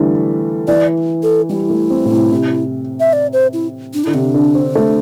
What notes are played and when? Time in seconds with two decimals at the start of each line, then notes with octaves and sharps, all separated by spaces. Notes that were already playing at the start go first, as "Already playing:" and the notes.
Already playing: D3 E3 G3 A3
0.68 E3 D5
1.23 A4
1.50 G3 E4
1.70 A3
1.90 C4
2.05 A2
2.11 C3
2.31 C3
3.00 E5
3.13 D5
3.33 C5
3.53 E4
3.94 D4
4.04 D3 E4
4.14 C3 D4
4.34 D3
4.55 C4
4.75 A3